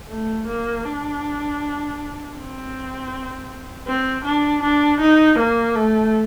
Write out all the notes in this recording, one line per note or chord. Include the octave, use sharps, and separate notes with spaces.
A3
A#3
D4
C4
C4
D4
D4
D#4
A#3
A3